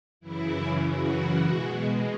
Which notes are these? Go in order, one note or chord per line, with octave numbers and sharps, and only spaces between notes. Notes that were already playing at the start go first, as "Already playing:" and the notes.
F#2 C#3 E3 E4
F#4
B2 G#3